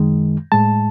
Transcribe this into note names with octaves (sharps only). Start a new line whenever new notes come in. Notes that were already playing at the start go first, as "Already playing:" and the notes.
Already playing: F#2 D#3 G#3
A2 G#3 A5